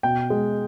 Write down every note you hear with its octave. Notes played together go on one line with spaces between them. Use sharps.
B2 G5
G#3